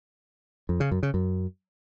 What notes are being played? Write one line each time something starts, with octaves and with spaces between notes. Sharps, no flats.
F2
C#3
F#2
C#3
F#2